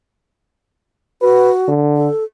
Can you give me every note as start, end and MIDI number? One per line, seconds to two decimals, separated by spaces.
1.22 1.69 66
1.22 1.51 71
1.68 2.08 50
1.96 2.24 69